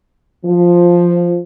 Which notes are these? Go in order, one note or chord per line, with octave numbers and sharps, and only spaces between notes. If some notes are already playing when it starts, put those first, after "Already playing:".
F3